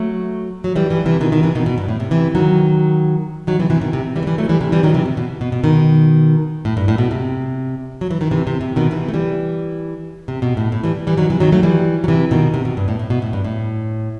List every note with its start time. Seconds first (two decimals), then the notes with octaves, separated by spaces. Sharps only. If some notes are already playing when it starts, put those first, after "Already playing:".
Already playing: F#3 A3
0.64 F#3
0.76 E3 G3
0.90 E3 G3
1.06 C3 E3
1.21 B2 D#3
1.32 B2 D#3
1.43 C3 E3
1.55 B2 D#3
1.66 B2
1.78 G2
1.89 A2
2.00 C3
2.11 C3 E3
2.35 D#3 F#3
3.47 D#3 F#3
3.60 C3 E3
3.70 C3 E3
3.81 B2 D#3
3.93 C3
4.16 E3 G3
4.23 A3
4.27 E3 G3
4.38 F#3 A3
4.49 E3 G3
4.61 C3 E3
4.72 E3 G3
4.83 D#3 F#3
4.94 C3 E3
5.06 C3
5.17 B2
5.41 B2
5.52 B2
5.63 B2 D#3
6.65 A2
6.77 G2
6.88 A2
6.98 B2
7.11 C3
8.01 F#3
8.11 E3
8.21 D#3
8.31 C3 E3
8.47 C3
8.61 C3
8.76 B2 D#3
8.91 C3 E3
9.09 A3
9.14 E3 G3
10.28 C3
10.42 B2
10.57 A2
10.72 A2
10.84 E3 G3
11.07 E3 G3
11.18 D#3 F#3
11.30 C3 E3
11.40 D#3 F#3
11.52 F#3 A3
11.63 E3 G3
12.04 F#3
12.08 C3 E3
12.31 B2 D#3
12.54 C3
12.65 B2
12.77 G2
12.88 A2
12.99 A2
13.10 B2
13.22 A2
13.33 G2
13.45 A2